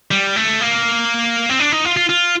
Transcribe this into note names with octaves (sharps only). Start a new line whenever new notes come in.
G3
A3
A#3
C4
D4
D#4
F4
F4
F4